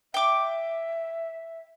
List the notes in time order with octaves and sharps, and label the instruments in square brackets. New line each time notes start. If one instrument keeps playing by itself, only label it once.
[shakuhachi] E5 [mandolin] G5 D6